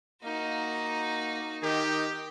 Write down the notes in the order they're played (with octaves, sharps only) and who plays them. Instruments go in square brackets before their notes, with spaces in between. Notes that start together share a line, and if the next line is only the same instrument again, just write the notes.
[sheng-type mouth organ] A#3 F5 [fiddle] D#4 F#4
[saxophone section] D#3 [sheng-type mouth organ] D#4 D#5 [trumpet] G4